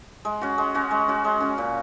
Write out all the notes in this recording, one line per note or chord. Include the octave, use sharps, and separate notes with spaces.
G#3
C#4 F#4
G#3
C#4 F#4
G#3
C#4 F#4
G#3
C#4 F#4
A#2